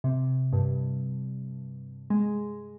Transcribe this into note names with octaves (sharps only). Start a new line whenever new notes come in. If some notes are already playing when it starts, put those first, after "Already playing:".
C3
G2
G#3